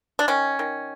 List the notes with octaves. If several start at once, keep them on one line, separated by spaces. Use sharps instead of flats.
D4
D#3 C#4
D#3